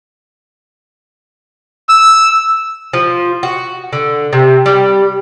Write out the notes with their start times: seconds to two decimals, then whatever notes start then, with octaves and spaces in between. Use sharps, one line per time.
1.89 E6
2.93 F3
3.43 F#4
3.93 D3
4.33 C3
4.66 G3